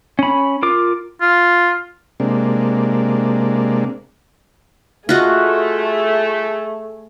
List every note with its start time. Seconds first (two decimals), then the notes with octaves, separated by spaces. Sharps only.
0.19 C#4 B5
0.63 F4 A#4 D6
1.21 F4
2.20 C3 G#3 A#3 D4
5.09 A3 F4 F#4 G#4 D#5